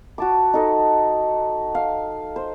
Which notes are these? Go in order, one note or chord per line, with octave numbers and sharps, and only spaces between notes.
F#4 A5 D6
D#4 A4 D#5
F5
C5